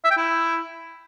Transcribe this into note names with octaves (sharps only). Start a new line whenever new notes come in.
E5
G5
E4